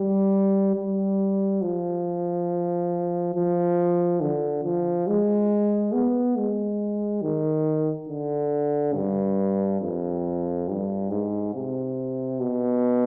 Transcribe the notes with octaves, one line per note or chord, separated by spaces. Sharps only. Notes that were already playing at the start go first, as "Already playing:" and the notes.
Already playing: G3
G3
F3
F3
D3
F3
G#3
B3
G#3
D#3
D3
G2
F2
G2
G#2
C3
B2